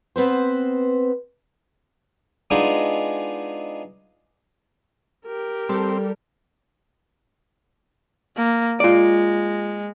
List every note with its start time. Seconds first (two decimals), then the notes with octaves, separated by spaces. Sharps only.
0.16 B3 C4 B4 C5
2.51 G#3 B3 D4 D#4 F4 G#4
5.26 G4 A#4
5.69 G3 C4 A4
8.37 A#3
8.80 G#3 F4 D5